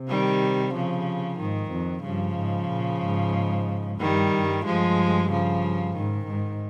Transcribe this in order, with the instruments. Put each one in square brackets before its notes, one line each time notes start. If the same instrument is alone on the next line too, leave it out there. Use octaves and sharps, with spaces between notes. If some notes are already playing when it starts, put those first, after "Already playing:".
Already playing: [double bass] C3
[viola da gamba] D#3 G3
C#3 F3
[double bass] G#2 [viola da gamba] D#3
[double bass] F2
[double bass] G2 [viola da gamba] C#3 F3
[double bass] G#2
A#2
G#2
[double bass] G2 [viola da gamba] D#3 G3
[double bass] G2
[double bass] G2 [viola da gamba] F3 G#3
[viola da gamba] C#3 F3
[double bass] G#2 [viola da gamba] D#3
[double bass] G#2